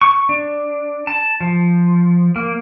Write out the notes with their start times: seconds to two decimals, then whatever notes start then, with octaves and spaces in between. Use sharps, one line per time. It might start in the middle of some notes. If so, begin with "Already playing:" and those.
0.01 C#6
0.29 D4
1.07 A5
1.41 F3
2.36 A#3